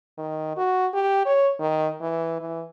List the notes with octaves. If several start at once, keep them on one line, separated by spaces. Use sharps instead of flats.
D#3
F#4
G4
C#5
D#3
E3
E3